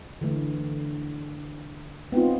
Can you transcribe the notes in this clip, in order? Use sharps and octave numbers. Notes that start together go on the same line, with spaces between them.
D3 E3 A3
B3 C4 D#4 F4